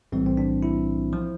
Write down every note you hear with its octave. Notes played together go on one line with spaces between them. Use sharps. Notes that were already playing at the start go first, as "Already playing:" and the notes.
B1 A2 E3 G3 C4
C4
D4
E4
F3